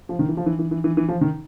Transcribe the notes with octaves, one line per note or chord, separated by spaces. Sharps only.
F3
D#3
E3
F3
E3
E3
E3
E3
E3
F3
D#3